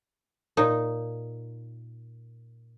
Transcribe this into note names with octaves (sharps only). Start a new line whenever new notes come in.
A#2 D#4